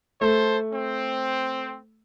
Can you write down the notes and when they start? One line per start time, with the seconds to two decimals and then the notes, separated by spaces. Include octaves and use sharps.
0.21 A3 A4 C5
0.73 C4